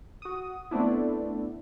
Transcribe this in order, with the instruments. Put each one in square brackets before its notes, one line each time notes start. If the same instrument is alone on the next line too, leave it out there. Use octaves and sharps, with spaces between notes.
[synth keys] F#4 D#6
A3 B3 C4 D4 E4